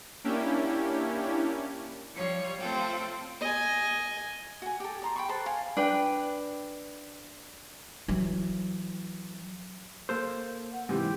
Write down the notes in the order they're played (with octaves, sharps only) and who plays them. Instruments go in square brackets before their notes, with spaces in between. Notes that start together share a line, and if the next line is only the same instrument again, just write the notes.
[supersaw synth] A#3 C#4 D4 E4 G4
[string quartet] F3 G3 C#5
A3 C4 F4 A4 G5
[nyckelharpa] D#5 G#5
[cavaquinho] F#4 G#5
G4 A4
D5 A#5 C6
G5 B5 C#6
A4 B4 C5 A5
F5 G#5
[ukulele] D4 B4 G5
[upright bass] E3 F#3
[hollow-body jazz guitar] A#3 A4 C5
[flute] F#5
[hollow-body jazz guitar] G#2 C3 E3 [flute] G4